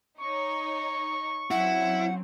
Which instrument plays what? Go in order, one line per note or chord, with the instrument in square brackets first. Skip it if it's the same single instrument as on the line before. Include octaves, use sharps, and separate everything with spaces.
[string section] D#4 C#5 [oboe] C#6
[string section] F#3 C4 C#4 [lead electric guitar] E4 [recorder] F#5